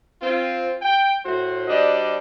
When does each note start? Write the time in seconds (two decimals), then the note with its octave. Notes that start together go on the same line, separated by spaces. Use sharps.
0.22 C4 F4
0.82 G5
1.25 A2 F#4 C5
1.68 G3 D4 F#4 C5 D#5